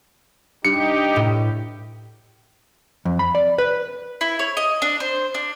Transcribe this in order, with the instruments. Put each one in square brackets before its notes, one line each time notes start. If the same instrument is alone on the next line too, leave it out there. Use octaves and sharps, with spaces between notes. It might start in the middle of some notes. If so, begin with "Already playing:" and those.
[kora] G2 [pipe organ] D#4 G4 [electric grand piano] C#7
[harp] A2
[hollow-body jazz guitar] F2
B5
D5
B4
[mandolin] E4
C#5
D#5
D4
C5
D4